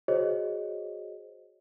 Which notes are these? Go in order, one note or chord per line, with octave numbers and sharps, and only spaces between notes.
F#4 G#4 C5 C#5 D#5